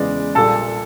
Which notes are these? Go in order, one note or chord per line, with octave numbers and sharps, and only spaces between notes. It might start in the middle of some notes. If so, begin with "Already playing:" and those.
Already playing: E2 C#3 E3 G#3 D5
A#1 A#2 G3 A4 A5